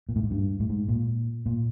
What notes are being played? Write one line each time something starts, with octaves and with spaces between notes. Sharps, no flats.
A#2
A2
G#2
G2
A2
G#2
A#2
A#2